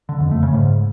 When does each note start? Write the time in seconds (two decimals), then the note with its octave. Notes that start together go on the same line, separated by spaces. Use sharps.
0.09 D3
0.20 F2
0.31 A3
0.43 C#3
0.54 G#2